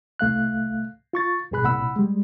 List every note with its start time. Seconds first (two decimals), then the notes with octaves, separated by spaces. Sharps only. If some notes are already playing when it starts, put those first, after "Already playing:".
0.19 C2 A3 F5 F#6
1.13 F4 C#6 A6
1.51 C2 G2 B2 G#4 B5 F#6
1.64 C2 A#2 F#5 B5 E6
1.96 G3 G#3